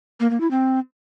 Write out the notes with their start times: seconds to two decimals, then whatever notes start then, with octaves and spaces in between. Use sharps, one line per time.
0.20 A#3
0.30 A#3
0.41 E4
0.51 C4